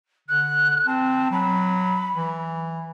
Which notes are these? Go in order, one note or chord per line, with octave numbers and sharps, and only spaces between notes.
D3 F#6
C4 A5
F#3 B5
E3